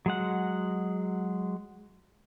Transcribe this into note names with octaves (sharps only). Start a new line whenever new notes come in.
F#3 G#3 F#5